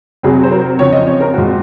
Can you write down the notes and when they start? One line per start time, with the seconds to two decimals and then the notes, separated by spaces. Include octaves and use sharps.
0.23 C3 F#3 C4 G#4
0.43 C5
0.51 A#4
0.79 C#3 F3 C4 C#5
0.93 D#5
1.07 C#5
1.20 A#4
1.34 A#2 G#3 C4 F#4